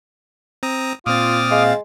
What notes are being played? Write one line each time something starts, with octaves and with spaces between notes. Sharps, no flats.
C4 A#5 D#6
A#2 C4 F4 D6 D#6 F6 A6
G#3 F5